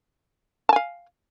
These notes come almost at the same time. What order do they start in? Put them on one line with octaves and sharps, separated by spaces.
A5 G#5 F5